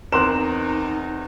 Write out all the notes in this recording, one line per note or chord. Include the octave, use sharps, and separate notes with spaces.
E2 C4 D#4 A#4 C6 F#6 E7